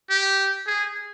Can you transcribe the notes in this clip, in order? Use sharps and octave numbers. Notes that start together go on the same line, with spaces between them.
G4
G#4